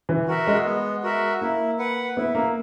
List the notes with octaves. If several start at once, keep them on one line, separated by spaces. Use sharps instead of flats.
E3
F#4 A#4 E5
G#3
B3
F#4 A#4 E5
A#3 E4
B4 F#5
B3 E4
A#3